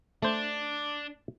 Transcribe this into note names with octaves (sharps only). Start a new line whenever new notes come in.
A3 D4 C5